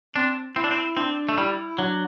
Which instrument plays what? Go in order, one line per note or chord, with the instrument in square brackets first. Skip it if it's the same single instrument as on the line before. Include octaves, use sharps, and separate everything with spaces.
[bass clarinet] C4 [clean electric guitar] D4
[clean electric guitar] C4 [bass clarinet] E4
[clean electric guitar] D4
C4
[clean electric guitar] C4 [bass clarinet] D4
[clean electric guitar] A3
[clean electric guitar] G3 [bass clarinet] E4
[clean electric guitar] F#3 [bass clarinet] D4